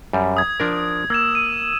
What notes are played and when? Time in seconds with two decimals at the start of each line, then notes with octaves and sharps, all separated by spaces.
0.13 F#2 G3
0.37 D#6 G#6
0.60 F3 D4 A#4
1.10 A#3 E6 G#6 E7
1.35 D#7